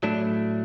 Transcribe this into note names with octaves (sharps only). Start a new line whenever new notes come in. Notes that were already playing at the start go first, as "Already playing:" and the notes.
A2 F#3 A3 D4